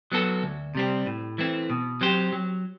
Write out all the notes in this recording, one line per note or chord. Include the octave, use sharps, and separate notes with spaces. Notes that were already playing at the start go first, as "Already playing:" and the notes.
F#3 B3 F#4 A4
D2
C3 G3 C4
A2
E3 A3 C4
B2
F#3 C4 G4 C5
F#3